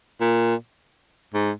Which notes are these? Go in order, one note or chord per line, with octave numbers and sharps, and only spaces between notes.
A#2
G#2